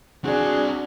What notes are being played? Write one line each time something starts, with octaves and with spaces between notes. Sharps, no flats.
C4 D4 F#4 G#4 D5